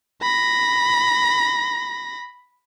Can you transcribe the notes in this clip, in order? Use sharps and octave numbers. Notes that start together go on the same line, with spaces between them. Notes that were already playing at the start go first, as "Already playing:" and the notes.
B5 A#6